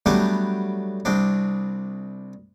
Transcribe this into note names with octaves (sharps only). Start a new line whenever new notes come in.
F#3 G3 A3 B3 D4 G4
C2 C4 D4